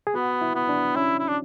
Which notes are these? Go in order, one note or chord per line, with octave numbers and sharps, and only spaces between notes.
G#4
B3 F#4
E4
B3
D4
C#4 E4
E4
D4